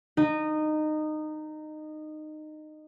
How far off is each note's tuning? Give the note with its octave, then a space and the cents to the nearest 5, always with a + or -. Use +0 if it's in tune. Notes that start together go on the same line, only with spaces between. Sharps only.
D#4 -20